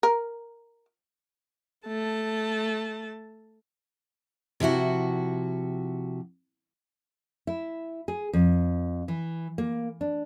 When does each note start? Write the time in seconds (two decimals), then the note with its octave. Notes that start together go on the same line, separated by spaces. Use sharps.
0.03 A#4
1.88 A3 A5
4.60 C3 F3 E4 F#4
7.47 E4
8.08 G#4
8.33 F2
9.08 E3
9.58 A#3
10.01 D4